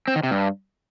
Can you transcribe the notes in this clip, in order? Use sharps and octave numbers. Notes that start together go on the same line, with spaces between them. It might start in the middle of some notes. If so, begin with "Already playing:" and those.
C4
D#3
C3
G2